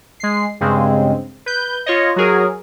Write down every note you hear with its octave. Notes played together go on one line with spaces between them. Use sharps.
G#3 C7
G2 C#3 G#3 C4
B4 G6
F4 C#5 D#5
F#3 F#4 G#4 A#4